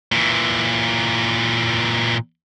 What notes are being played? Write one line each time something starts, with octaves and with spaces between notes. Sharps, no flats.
A#2 E3